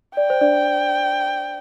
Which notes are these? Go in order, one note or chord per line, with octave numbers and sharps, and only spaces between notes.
D5 G5
C5
D4 D5